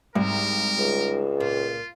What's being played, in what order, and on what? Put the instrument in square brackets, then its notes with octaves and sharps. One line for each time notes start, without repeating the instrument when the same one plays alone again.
[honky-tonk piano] C2 [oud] G#2 [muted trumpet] A#4
[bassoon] C#2
[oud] A#2 [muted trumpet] F4